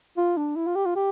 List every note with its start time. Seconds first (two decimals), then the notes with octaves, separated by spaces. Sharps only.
0.17 F4
0.37 D4
0.56 E4
0.67 F4
0.76 G4
0.86 F4
0.96 G4